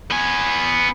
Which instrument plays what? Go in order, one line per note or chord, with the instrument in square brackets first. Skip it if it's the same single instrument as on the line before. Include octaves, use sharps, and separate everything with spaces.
[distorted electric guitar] B3 G#5